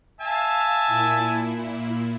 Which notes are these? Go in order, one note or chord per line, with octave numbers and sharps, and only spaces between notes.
E5 F5 G#5 A5
A#2 E4